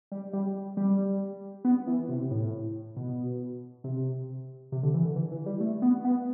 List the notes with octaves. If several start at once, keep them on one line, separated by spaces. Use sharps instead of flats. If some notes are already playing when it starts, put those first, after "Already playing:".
G3
G3
G3
B3
E3
C3
A2
B2
C3
C3
D3
E3
D3
E3
E3
G3
A3
B3
B3